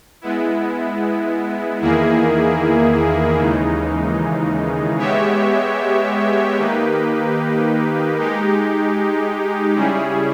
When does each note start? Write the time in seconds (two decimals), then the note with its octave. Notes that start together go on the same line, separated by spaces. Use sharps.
0.21 G#3 B3 E4
1.81 E2 D#3 A#3 E4 G#4
3.40 D#2 C#3 E3 G#3 D#4
4.98 G#3 B3 G4 C#5 E5
6.58 D#3 A#3 D#4 G4 B4
8.17 G#3 D#4 G4
9.76 C#3 G3 C#4 E4 G#4